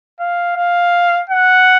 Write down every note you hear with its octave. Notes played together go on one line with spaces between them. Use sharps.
F5
F5
F#5